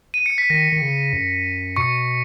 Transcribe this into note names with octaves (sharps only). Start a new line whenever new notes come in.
D#7
C#7
B6
D#3 A#6
D#3
C#3
F#2
B2 C#6 C#7